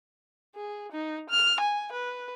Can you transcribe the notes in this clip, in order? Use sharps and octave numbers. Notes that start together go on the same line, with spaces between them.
G#4
D#4
F6
G#5
B4